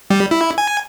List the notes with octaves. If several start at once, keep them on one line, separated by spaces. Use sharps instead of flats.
G3
E4
G#5